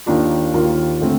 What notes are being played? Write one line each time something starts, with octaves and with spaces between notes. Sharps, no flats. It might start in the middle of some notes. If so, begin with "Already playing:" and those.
D#2 D#3 A#3 D4 F4
D#2 D#3 A#3 F4
D3 A3 C4